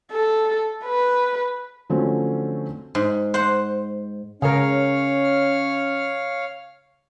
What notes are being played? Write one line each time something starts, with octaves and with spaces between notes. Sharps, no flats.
A4
B4
D3 F3 F#3 A3 C4 C#4
G#2
C5 F#5
C#3 C#4 A#4 C#5 F5 F6